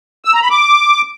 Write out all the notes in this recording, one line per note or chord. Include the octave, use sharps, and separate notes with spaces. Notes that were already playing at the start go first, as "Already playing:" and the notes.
E6
A#5
B5
D6